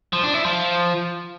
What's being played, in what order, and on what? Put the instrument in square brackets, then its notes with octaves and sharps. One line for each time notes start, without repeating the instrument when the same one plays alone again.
[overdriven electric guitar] F3
D4
E4
F3